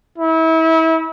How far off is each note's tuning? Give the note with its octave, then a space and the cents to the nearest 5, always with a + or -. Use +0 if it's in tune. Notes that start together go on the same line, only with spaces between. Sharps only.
E4 -30